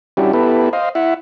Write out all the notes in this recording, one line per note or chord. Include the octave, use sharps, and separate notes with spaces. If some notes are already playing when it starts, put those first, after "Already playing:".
G3 C#4 D4 E4 F#4 G4
B3 E4 G4 A4 B4
C5 D#5 F5
E4 E5 F#5